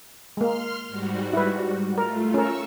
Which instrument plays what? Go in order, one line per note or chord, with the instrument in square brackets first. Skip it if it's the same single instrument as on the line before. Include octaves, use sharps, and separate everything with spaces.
[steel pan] G#3 A#3 [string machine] C6 F6
[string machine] G#2 G3 F#4
[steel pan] E4 B4
[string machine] A3 F4 [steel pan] A#4
[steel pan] C#4 A#4 [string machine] C#6 E6